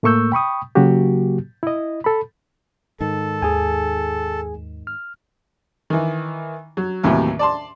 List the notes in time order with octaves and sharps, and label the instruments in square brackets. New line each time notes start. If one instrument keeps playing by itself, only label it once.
[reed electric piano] A2 A3 A#3 C#6 E6 G6
G5 B5 C#6 D#6
C#3 F#3 A#3 F#4 G4
E4 D#5
A4 B5
[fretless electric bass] G#2 D#3 [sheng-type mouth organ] A4
[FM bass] D#2 [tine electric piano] G#4 G#5
[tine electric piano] F6
[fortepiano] D#3 E3
F#3
D#2 A2 C3 E3 F#3
D5 A5 C6